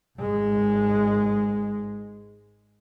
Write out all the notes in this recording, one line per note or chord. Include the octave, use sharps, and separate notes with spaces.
G#1 G#3